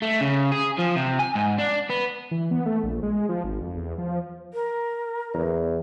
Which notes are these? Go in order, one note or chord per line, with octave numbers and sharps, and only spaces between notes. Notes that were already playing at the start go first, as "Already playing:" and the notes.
A3
C#3
G#4
F3
C3
G#5
G#2
D4
B3
E3
B3
A3
A#1
G#3
F3
G#1
F2
E2
F3
A#4
E2